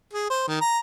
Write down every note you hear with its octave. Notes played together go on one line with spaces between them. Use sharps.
G#4
C5
D#3
A#5